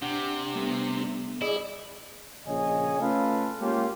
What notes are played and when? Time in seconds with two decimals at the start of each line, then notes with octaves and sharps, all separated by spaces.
0.02 C3 D4 F#5
0.55 G3 A3 B3
1.42 E4 G#4 D5 D#5
2.47 A#1 C#3 C#5 D#5 G#5
3.00 A3 C#4 F4 A4 B4 F5
3.60 G#3 A#3 C#4 F4 G4